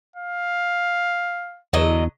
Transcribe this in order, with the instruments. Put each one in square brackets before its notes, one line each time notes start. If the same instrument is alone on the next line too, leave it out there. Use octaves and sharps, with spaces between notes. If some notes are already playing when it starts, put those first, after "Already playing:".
[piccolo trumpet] F5
[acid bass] E2 [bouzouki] D3 F#3 D#5